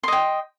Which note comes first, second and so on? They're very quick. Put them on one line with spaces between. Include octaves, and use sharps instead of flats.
C6 D#5 G5